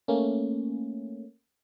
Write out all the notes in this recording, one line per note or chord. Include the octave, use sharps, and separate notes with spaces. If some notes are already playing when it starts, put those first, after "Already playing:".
A3 A#3 C#4